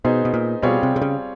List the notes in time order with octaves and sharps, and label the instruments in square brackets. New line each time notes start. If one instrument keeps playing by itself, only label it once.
[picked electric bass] B2 [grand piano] B3 D#4 G#4 C5
[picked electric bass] B2
A#2
[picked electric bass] B2 [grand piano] G3 C4 F4 G#4 C#5
[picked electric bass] C3
C3
C#3